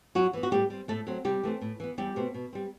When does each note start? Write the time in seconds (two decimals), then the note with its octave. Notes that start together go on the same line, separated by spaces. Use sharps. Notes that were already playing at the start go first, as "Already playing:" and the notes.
0.15 F#2 F#3 F#4
0.33 E3 B3
0.43 F#4
0.51 A2 G3 G4
0.70 G3 C4
0.88 A2 A3 A4
1.07 F#3 A3 C4
1.25 C3 G3 G4
1.43 E3 A3 C4
1.61 A2
1.80 E3 B3
1.98 E2 G3 G4
2.16 B2 A3 C4
2.34 B2
2.53 G3 C4